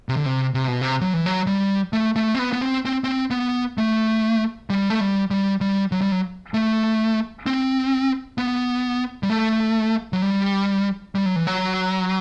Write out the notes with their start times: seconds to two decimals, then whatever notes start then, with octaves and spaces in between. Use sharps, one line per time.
0.09 C3
0.17 D3
0.26 C3
0.54 C3
0.68 B2
0.81 C3
1.01 F#3
1.13 E3
1.26 F#3
1.47 G3
1.93 A3
2.16 A3
2.35 C4
2.39 B3
2.53 B3
2.61 C4
2.85 C4
3.04 C4
3.30 B3
3.78 A3
4.70 G3
4.90 A3
5.01 G3
5.31 G3
5.61 G3
5.92 F#3
6.01 G3
6.12 F#3
6.54 A3
7.46 C4
8.38 B3
9.23 G3
9.30 A3
10.13 F#3
10.22 G3
11.15 G3
11.26 F#3
11.36 E3
11.47 F#3